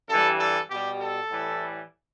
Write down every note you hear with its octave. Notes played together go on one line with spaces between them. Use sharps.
G2 E3 G3 A4
A4
B2 G3 G4
A4
A2 E3 G3